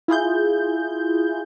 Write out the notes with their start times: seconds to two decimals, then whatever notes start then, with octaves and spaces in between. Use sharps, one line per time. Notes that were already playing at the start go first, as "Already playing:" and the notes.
0.08 E4 F4 G#4 G6